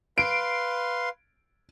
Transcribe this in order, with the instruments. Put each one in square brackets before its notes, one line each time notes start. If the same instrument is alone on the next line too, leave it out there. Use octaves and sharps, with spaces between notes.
[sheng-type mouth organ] B4 F5 C6 [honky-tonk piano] D7